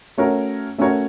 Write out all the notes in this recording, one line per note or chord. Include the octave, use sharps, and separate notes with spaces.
A3 C#4 F#4 A#4 C#5
A3 C#4 F#4 A#4 C#5